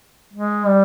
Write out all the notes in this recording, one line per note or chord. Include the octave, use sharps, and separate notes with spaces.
G#3
G3